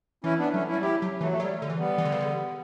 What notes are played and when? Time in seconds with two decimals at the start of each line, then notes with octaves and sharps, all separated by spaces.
0.24 E3 C#4 E4
0.39 B3 D4
0.53 F#3 A3 C#4
0.68 C#4 E4
0.73 G3
0.82 F#3 E4 G4
1.02 F#3
1.21 E3 F#3 A3
1.32 A3
1.40 F#3 G3
1.62 D3
1.70 E3
1.78 G3 B3
1.98 E3
2.05 D3
2.12 C#3
2.21 D3